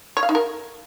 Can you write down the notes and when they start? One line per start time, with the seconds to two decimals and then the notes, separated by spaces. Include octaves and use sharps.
0.17 C#5
0.23 F5
0.29 D#4
0.35 A#4